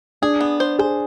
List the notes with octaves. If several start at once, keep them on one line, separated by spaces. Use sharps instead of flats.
D4 G#4
B3
C5
G#4 C5